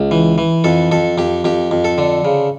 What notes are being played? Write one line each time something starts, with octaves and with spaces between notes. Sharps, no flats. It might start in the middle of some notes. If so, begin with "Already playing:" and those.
Already playing: C#2
E3
E3
F2 A4
F2 A4
F2 G4
F2 G4
F2
A4
D3
C#3